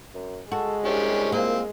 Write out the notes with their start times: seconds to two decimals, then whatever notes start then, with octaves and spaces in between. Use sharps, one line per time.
0.14 F#2
0.52 G#3 F#4 A4
0.85 C2 C#4 D4 G4
1.32 A#3 C4 F4